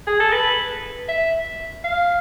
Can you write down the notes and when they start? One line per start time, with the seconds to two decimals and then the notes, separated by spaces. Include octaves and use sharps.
0.07 G#4
0.20 A4
0.33 B4
1.09 E5
1.84 F5